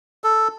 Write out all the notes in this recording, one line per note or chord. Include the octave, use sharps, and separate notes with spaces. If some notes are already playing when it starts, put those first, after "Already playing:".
A4